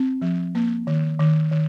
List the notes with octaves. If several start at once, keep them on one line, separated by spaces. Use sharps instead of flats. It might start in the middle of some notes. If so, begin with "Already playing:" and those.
Already playing: C4
F3
A#3
D#3
D#3
D#3